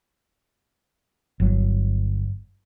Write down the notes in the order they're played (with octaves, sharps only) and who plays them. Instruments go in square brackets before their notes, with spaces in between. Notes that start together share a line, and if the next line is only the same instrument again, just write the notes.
[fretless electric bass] G1 F#3